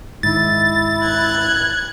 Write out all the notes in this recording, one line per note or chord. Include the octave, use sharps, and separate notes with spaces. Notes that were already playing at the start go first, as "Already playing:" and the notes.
G#2 D#3 E4 A6
F#6 G#6